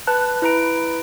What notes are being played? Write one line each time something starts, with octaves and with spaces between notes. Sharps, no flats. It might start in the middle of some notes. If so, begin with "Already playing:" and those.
B4 A5 F#6
E4 B4 A#5 D7